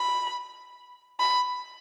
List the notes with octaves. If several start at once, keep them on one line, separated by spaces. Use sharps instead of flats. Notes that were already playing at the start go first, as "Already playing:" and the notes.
Already playing: B5
B5